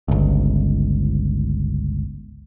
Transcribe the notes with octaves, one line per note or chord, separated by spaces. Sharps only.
G1 C#2